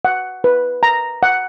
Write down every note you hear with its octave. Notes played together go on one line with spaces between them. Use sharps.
F#5
B4
A#5
F#5